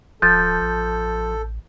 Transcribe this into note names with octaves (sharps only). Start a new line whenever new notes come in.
D1 F3 A4 G6 A6
A1